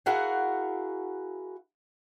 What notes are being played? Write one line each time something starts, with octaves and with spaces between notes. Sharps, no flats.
E4 F#4 G#4 A#4 F5 F#5